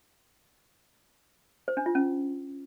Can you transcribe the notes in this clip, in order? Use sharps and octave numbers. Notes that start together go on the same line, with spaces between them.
C5
D4
F4
C#4